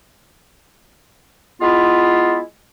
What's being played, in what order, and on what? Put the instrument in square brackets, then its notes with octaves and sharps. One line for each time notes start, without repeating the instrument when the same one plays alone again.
[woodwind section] G#3 B3 E4 F4